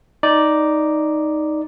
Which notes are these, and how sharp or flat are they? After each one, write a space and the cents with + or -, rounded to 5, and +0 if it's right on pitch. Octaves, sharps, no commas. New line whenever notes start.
D#4 +0 D5 +0